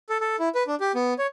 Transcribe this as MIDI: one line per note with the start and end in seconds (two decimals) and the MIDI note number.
0.09 0.18 69
0.21 0.36 69
0.39 0.49 64
0.55 0.63 71
0.67 0.75 62
0.80 0.92 67
0.95 1.14 59
1.18 1.27 73